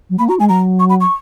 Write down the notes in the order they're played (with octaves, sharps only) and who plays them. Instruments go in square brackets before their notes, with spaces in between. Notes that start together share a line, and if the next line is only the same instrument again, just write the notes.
[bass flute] F#3
[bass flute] A#3 [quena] B5
[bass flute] F#4 [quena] A#5
[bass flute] G#3 [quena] G#5
[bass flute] F#3 [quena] A#5
[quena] C#6
B5
C#6